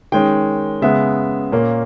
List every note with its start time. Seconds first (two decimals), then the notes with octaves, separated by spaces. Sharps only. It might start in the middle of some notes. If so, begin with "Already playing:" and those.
0.12 D#3 G#3 C#4 G5
0.82 C#3 G#3 B3 E5
1.52 A#2 A#3 C#4